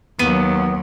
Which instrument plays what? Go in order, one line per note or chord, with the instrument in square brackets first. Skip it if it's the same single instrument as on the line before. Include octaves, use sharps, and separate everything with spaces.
[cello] D#2 F#3 [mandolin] B3